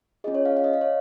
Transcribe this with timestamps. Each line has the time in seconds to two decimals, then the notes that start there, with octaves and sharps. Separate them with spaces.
0.24 C#4 F4 G#4 D#5
0.35 C#5
0.45 F5
0.57 F5
0.64 D#5
0.74 F5
0.81 C#5